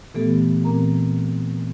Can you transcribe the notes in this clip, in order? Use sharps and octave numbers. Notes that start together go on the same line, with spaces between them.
A#2 E3 A3 B3 G4 A4
A#2 E3 C4 A#4 A#5